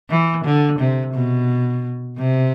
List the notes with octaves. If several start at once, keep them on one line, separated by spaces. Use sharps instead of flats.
E3
D3
C3
B2
C3